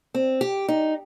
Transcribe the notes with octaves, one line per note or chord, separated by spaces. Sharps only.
C4
G4
D#4